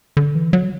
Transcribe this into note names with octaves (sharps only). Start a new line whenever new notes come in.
D3
E3
F#3